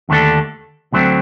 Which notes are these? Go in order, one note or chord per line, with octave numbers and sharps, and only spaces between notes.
D#2 D3 A3 D4 A4
D2 D3 F#3 A3 C4